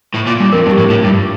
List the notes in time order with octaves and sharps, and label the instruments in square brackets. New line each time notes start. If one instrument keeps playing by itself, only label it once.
[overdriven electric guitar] A2
A#2
G2
[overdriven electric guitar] F2 [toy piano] A#4
[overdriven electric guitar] G2
[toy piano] G4
[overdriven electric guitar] A2
[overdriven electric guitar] A2 [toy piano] F4
[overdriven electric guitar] G2